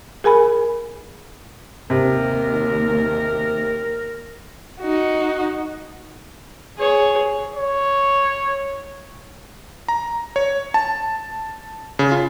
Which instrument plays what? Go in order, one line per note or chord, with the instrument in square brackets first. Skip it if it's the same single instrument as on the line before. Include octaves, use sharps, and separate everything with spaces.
[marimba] G#4 A#4 G#5 B5
[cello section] D#2 [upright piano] C3 [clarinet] A#4
[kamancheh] D#4 F#4
[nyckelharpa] G#4 C#5
[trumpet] C#5
[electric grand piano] A#5
C#5
A5
C#3
F4